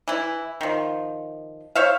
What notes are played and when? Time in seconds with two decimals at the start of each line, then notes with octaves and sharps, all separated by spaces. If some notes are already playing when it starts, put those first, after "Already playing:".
0.08 E3 E4
0.61 D#3 F3
1.75 C5 C#5 E5 F5